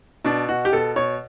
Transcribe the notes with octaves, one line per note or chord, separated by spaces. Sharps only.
B2 D4
B2 F#4
G4
B2 A4
B2 C#5